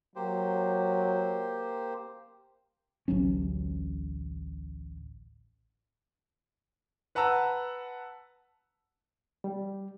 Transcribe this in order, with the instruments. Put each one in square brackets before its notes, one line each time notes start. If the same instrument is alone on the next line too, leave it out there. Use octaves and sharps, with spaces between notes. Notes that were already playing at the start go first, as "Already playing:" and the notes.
[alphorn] F#3 [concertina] A#3 G4 C5
[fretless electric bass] A1 D2 F#3 C#4
[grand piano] B4 F#5 A5 A#5 E6
[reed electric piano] G3